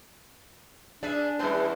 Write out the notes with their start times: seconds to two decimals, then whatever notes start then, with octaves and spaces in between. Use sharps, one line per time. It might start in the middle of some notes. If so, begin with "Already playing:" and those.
1.03 B3 D4 G#4 D5 E5
1.39 E2 G3 B3 C#4 D5 A5